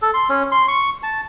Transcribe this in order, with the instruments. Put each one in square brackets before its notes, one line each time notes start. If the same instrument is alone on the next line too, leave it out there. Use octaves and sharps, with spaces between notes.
[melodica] A4
C6
C#4
C6
C#6
A5